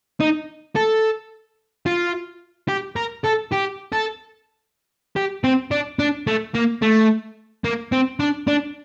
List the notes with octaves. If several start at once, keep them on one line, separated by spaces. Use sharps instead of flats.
D#4
A4
F4
G4
A#4
A4
G4
A4
G4
C4
D4
D4
A3
A#3
A3
A#3
C4
D4
D4